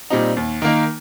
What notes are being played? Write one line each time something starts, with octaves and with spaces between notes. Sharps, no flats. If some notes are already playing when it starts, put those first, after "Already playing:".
A#2 G3 C4 D#4
D#2
D#3 A#3 D#4